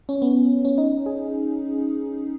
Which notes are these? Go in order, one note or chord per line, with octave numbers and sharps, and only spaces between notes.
C#4
B3
C#4
D#4
G#4